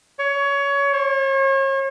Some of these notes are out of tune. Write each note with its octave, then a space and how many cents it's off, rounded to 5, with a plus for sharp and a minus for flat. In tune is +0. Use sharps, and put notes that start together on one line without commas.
C#5 +20
C#5 -40